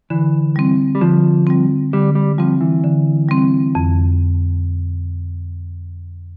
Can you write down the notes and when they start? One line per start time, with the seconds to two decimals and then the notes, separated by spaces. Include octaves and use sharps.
0.10 D3 E3
0.56 G3 C4
0.95 G3
1.01 D3 F3
1.47 G3 C4
1.93 D3 G3
2.15 G3
2.38 F3 G3 C4
2.61 E3
2.84 D3
3.29 G3 C4
3.75 F2